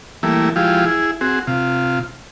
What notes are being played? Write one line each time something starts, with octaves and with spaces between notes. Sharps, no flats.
E3 G3 A3 A#3 E4
F3 G#3 E4 F4 G4
E4 G#4
C4 F#4 G#4
C3 F4